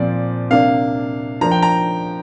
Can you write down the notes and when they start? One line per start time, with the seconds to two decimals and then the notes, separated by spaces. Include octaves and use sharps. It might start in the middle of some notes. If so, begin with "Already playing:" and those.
Already playing: A#2 F3 C4 D5
0.50 C3 A#3 D4 F5
1.41 F3 A#3 D4 A#5
1.51 G5
1.62 A#5